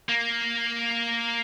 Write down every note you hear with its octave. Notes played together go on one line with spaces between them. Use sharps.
A#3